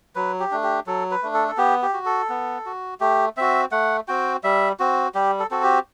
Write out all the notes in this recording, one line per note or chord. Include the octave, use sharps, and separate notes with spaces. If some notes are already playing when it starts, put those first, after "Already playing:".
F#3 B4
G4
A3 D4
G4
F#3 A4
B4
A3 D4
A4
A4
B3 G4
G4
F#4
A4
B3
F#4
A3 G4
C4 F#4 E5
A3 F#5
C4 F#4 G5
G3 E5
C4 F#4
G3 G4
A4
C4 F#4 A4
G4